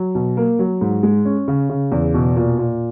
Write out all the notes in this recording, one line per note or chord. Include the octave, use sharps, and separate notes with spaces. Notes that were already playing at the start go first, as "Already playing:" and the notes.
Already playing: F#3
B2
A#3
F#3
G#2
G#3
C#4
C#3
C#3
E2
B2
A#2
A#2